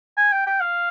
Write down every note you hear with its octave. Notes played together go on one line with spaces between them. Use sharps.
G#5
G5
G5
F5